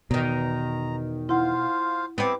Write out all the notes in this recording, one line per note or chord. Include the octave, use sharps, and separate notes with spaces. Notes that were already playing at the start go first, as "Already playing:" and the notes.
E2 B2 D#3 A#5
E4 F4 C5 F5 F#5
B3 C4 E4 G4 D6